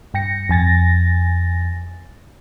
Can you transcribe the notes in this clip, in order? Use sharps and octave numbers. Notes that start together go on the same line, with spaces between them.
G2 G5 A#6 C#7
F2 G#5 A6 A#6